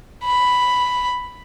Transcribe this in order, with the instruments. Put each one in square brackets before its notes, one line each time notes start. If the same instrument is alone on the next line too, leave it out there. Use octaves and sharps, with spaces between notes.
[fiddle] B5